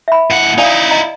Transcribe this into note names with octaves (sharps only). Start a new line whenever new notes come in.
E5 B5
A2 F#5
D#4 E4 D5 F5 G#5
D#5 A#5